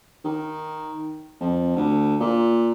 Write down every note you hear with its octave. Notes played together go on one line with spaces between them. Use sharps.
D#3
F2
D2
A#2